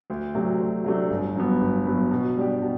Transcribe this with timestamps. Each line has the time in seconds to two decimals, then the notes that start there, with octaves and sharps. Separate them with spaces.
0.10 D2
0.35 C3 F#3 A3 D4
0.60 D2
0.84 C3 F#3 A3 D4
1.10 G1
1.36 G2 F#3 B3
1.61 G1
1.86 G2 F#3 B3
2.11 B2
2.37 G3 D4 G4
2.62 B2